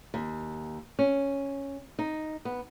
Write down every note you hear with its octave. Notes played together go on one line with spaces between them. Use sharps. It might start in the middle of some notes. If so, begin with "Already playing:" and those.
D#2
C#4
D#4
B3